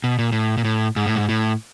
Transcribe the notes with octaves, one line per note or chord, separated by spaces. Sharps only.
B2
A#2
A2
A#2
A2
G#2
A2
G#2
A2